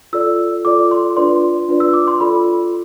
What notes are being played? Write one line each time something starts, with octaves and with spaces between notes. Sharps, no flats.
F4 A4 D5 E6
F4 A4 D5 D6
C6
D4 F4 B4 D5 C6
D4 F4 B4 D5
E6
D6
C6
F4 A4 D5 B5